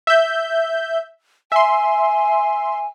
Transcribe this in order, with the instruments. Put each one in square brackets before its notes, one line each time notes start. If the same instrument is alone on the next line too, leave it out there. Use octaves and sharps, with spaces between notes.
[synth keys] E5 G6
[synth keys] E5 C6 [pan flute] G#5